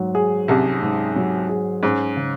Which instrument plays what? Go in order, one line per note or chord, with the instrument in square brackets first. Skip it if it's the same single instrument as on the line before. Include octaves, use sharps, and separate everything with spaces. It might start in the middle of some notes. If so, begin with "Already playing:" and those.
Already playing: [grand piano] G#2 F#3
G#4
[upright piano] C2 C3 [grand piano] C#4
[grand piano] G#2
F#3
G#4
[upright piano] G#2 [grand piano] C#4
[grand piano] C#3